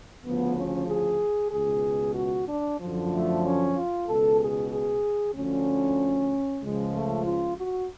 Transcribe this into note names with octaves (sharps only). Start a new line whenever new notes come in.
D2 C#3 F3 B3
C#4
G#4
C#2 B2 G#4
F#4
D4
F#2 D3 F3
A3
C#4
F4
C#2 B2 A4
G#4
G#4
D2 D3 F3 C#4
C#2 C#3 F3 G#3
A3
F4
F#4